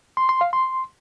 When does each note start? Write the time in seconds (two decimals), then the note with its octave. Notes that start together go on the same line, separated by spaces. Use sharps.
0.17 C6
0.29 C6
0.41 F5
0.53 C6